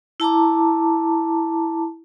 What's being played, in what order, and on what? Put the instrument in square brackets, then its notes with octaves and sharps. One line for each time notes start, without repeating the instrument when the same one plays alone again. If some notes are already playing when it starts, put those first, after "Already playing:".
[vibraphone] E4 A5 A#5 D6